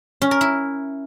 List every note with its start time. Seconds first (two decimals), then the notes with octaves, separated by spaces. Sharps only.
0.22 C#4
0.31 A#4
0.41 E4